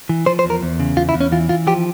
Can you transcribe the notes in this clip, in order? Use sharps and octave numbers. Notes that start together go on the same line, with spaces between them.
E3
F3 C5
C5
E2
A#4
E2
C#3
E2 F4
E4
E2
C#4
E3 F4
E3 F4
F3 G4